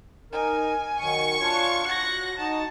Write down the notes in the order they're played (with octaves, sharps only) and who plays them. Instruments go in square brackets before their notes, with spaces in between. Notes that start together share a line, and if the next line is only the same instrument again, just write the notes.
[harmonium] D#4 A#4 [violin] G#5
[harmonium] D#3 F#3 [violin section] C#6
[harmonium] D4 F4 C#5
[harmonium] F#4 [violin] F#6 A#6
[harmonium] D#4 F#4 [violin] A5